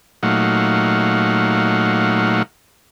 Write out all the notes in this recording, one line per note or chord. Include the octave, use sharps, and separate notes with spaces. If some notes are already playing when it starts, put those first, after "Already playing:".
A#2 F#3 A3 D#4 F5 F#5